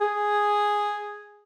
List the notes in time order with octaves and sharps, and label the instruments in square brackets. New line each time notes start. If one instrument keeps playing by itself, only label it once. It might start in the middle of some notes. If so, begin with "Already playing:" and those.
[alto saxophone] G#4